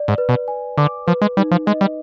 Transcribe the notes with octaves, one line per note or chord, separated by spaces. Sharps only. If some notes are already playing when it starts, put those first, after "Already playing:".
Already playing: D5
G#2
B4
B2
G#5
D3 D6
F3 B4
G#3
G3 D#4
F3
G#3 D#5
G3